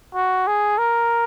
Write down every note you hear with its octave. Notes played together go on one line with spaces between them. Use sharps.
F#4
G#4
A#4